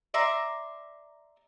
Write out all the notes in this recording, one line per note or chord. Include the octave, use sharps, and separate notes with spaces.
D5 E5 A#5 C6